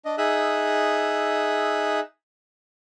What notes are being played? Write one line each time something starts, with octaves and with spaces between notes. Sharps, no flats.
D4 D#5
D#4 G#4 E5 D#6 E6 F#6